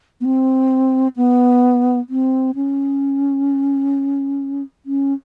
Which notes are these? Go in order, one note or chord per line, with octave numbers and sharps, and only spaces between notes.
B3
C4
B3
C4
C#4
C#4